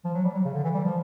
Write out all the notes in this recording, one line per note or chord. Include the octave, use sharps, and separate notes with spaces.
F3
F#3
G3
F#3
C#3
D3
E3
G3
F3